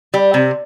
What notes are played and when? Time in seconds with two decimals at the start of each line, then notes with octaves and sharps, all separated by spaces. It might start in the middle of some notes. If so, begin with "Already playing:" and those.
0.14 G3
0.34 C3